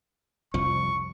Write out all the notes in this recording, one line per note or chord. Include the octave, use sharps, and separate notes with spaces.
C2 F2 F3 C#6